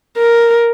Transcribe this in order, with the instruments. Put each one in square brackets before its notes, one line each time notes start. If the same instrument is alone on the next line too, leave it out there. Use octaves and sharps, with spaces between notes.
[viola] A#4